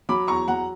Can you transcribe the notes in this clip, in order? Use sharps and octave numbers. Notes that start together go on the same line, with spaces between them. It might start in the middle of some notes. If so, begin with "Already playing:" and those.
F#3 B5 D6
E2 A#5 C#6
F#3 F#5 A#5